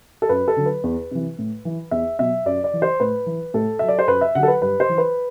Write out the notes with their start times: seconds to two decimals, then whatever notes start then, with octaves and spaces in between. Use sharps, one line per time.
0.22 A4
0.29 F#2 B4
0.48 A4
0.56 D3 F#3
0.66 B4
0.84 E2
1.11 C3 E3
1.39 A2
1.65 E3
1.91 E2 E5
2.19 B2 F#3 E5
2.45 F#2 D5
2.64 D5
2.73 E3
2.82 C5
3.00 A2 B4
3.26 E3
3.54 A2 A4
3.79 F#3 E5
3.88 D5
3.99 C5
4.08 F#2 B4
4.21 E5
4.35 D3 F#3 F#5
4.43 A4
4.48 B4
4.62 G2 B4
4.80 C5
4.89 E3
4.98 B4